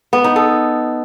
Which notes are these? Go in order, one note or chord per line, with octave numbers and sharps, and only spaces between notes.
B3
D#4
A4